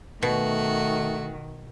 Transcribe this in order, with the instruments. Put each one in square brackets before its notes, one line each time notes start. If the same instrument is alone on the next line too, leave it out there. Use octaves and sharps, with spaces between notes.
[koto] B2 [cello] D#3 [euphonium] A3 [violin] F#4